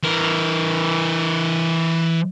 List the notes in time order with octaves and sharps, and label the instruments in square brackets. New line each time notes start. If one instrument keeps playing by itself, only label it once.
[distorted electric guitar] E3 A#4